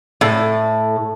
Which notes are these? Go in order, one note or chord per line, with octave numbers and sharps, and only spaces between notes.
A2